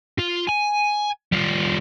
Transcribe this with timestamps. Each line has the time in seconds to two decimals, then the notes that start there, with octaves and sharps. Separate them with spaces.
0.18 F4
0.47 G#5
1.32 G3 F4